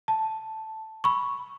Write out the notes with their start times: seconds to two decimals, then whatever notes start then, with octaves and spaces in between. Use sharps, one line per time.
0.08 A5
1.04 B5 C#6